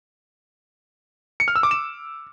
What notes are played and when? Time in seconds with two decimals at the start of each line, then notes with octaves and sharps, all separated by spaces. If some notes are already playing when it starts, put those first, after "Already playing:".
1.40 C#7
1.48 F6
1.56 E6
1.63 D6
1.71 E7